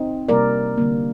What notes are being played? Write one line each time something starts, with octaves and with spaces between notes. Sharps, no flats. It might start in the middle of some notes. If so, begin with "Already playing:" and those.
Already playing: C4 D#4
C3 G3 A#3 A#4 D5
D3 G3 A#3